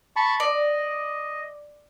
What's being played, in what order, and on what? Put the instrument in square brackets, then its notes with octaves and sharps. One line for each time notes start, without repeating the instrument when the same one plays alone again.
[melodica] A5 B5 C#6
[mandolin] D5 [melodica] D#5